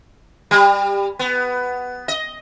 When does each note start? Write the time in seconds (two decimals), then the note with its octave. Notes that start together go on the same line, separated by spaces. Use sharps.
0.51 G3
1.19 B3
2.08 D#5